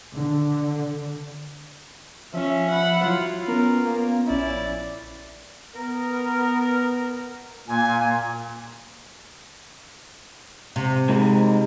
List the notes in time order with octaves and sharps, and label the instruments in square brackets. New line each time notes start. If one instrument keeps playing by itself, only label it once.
[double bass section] D3
[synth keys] F3 [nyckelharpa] C#4 [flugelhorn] E5
[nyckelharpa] F#5 B5
[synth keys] F#3 E4 [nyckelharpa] F4
[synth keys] B3 C#4 [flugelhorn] A#4
[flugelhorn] A#3
[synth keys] A#1 C#4 [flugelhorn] E4 [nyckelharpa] D5
[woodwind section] B3 A#4
[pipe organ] A#2 [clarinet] A#3 [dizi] G#5
[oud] C3
[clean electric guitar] G#3 D#4 A#4